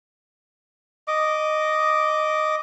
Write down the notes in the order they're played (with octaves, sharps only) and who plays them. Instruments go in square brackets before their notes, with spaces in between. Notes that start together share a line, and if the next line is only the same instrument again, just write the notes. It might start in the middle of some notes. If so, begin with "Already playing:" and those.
[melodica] D#5 D6